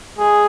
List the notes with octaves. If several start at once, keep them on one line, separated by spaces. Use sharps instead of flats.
G#3 G#4